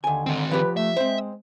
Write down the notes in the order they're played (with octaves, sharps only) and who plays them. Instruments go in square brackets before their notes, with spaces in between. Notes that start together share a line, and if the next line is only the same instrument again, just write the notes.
[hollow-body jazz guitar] D#2 G#5 [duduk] D3
[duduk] D3 [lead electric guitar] D#3 C4
[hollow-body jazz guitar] F3 G4 [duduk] B4
[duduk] A3 [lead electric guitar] E5
[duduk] G#3 [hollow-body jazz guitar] C4 C5